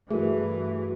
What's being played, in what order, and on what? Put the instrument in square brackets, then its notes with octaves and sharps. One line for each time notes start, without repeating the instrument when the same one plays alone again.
[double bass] G2 E3 [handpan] A3 E4 [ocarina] F#4 [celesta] G#4 A#4